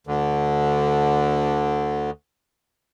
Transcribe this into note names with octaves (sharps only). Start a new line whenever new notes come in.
D2 D3